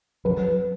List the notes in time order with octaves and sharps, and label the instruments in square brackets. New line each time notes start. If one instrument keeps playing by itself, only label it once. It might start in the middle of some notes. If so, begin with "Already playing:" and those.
[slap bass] F#3 [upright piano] B4